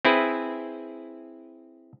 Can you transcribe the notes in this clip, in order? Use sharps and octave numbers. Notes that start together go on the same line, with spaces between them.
C4 E4 G#4 B4